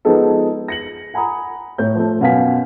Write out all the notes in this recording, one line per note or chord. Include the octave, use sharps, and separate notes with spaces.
F3 G#3 B3 D#4 G#4 A4
A#6 C#7 F#7
F#5 G#5 A#5 B5 D#6
A2 C#5 G6
F3 A3
F#2 B2 C#4 F5 G#5 B6